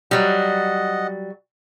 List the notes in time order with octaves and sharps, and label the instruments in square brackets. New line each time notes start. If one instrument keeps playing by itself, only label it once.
[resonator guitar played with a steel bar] F#3 G3 [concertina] D#5 F#5